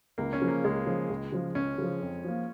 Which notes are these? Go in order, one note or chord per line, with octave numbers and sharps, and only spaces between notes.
C#2 A#3
C#4
C#3 F3
A#3
C#2 G#3
C#3 F3
C#2
C#3 F3
C#2 C#4
C#3 F3
F2
F3 A#3